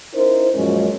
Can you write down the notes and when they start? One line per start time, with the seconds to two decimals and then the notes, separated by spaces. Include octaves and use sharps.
0.14 C#4 D#4 E4 A#4 C5
0.55 F#2 A#2 F3 G#3 C#4 C#5